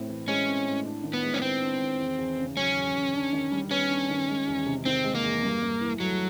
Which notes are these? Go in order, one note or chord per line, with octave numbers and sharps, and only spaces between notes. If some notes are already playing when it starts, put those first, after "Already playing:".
Already playing: A2 C4
E3
G#3 C#4
C4
A2
D4
D#3
B3
G#3
C#4
B3 C4
D4
D#3
E2
E2
C#3
F#3 C#4
E2
E2
D4
D#3
G3
B3 C#4
D4
D#3
G#3
E2
C3
D#3 C4
G#3
A#3
E2
G2
G2
E3
F#3 A3